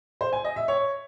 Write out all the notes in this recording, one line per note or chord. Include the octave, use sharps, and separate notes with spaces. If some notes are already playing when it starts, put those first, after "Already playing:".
C5
G#5
D#5
E5
C#5